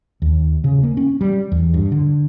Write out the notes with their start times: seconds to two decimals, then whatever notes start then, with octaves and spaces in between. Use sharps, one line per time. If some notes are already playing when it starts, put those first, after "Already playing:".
0.22 D#2
0.64 C#3
0.83 A#3
0.97 C#4
1.21 G3
1.52 E2
1.74 G2
1.92 D3